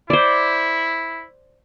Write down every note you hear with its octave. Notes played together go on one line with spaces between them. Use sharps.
E4 C5 D5